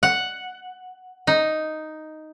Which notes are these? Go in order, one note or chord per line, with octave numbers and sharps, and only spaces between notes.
F#5
D#4